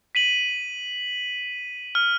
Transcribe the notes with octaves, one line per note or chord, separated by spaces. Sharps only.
B6 D#7 F#7
F6